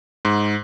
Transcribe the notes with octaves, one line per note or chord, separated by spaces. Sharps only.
G#2